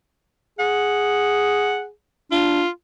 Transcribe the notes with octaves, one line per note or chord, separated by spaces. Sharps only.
G#4 F#5
D4 F4